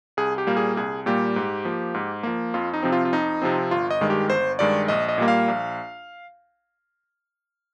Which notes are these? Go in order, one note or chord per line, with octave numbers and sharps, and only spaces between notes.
C2 G#4
G4
A#2 G3 A#3
G#4
C2 G#4
A#2 G3 A#3 G4
G#2
F3 A#3
G#2
F3 A#3
F2 F4
D#4
C3 F3 C4
F4
F4
F2 D#4
C3 F3 C4
G1 F4
D#5
G2 D#3 G#3
G4
G1 C5
G2 D#3 G#3 D5
A#1 D#5
D#5
A#2 G3 A#3
F5
A#1